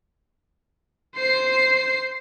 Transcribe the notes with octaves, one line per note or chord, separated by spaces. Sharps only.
C5 C7